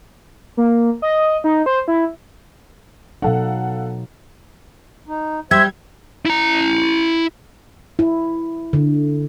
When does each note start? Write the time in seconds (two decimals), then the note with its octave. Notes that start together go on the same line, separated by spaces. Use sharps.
0.57 A#3
1.02 D#5
1.44 D#4
1.66 C5
1.88 E4
3.22 B2 F#3 D#4 A4 F5 F#5
5.08 D#4
5.51 G3 G4 C5 E5 G#6
6.26 E4 A#5
7.99 E4
8.73 D3